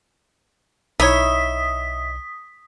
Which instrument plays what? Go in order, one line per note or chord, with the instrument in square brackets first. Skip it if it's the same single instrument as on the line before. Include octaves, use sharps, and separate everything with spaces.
[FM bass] B1 [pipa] D#4 E4 C#5 [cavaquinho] E5 [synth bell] D#6 B6